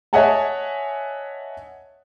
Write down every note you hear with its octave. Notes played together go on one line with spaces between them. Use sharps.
C#5 D#5 E5 F#5 G#5 A5